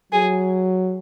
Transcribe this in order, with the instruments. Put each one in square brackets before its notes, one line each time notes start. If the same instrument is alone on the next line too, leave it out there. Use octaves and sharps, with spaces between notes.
[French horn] F#3 [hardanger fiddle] G#4